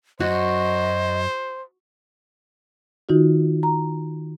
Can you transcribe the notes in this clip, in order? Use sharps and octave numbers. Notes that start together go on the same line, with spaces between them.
F#2 F#4 C5 D#5
D#3 D#4 F4 F#4
A#5